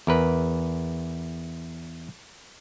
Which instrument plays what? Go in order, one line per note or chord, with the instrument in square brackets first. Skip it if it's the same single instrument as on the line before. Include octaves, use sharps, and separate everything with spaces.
[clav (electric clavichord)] E2 A#4 B4